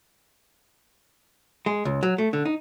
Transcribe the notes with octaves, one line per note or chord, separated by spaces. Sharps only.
G#3
C#2
F#3
A3
D3
D#4